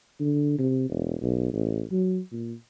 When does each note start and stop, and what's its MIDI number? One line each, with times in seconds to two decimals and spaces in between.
0.20 0.56 50
0.58 0.88 48
0.89 1.15 28
1.22 1.50 35
1.53 1.83 33
1.91 2.20 54
2.32 2.53 46